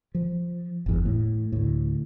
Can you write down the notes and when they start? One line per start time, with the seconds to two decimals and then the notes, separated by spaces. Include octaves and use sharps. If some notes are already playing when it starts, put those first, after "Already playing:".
0.15 F3
0.86 G1 E2
1.05 A2
1.52 D2 A2